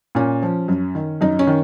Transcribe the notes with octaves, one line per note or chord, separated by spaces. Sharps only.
A#2 C#4
F3
F#2
D#3
F#2 D#4
C#4
D#3